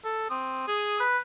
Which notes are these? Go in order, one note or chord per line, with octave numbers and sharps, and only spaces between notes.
A4
C4 D#6
G#4
B4